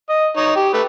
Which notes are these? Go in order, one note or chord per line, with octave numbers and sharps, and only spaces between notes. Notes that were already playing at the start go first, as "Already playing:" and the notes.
D#5
D#4 C#5
G4
A3 B4